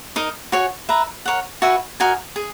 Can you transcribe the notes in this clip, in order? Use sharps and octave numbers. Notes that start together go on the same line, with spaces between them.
D#4 A#4 D#5
F#4 C#5 G#5
B4 E5 A#5
A#4 C#5 F#5
F#4 B4 E5 G#5
F#4 A#4 D#5 G#5
G#4